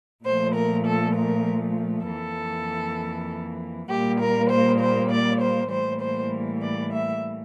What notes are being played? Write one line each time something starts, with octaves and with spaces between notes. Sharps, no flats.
A#2 F3 A3 C5
A#4
A4
A#4
F2 E3 A#3 A4
A#2 G3 A#3 G4
A#4
C5
C5
D5
C5
A2 E3 G3 A#3 C5
C5
D5
E5